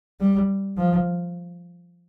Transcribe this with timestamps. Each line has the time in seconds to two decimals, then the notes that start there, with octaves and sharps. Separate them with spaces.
0.20 G3
0.78 F3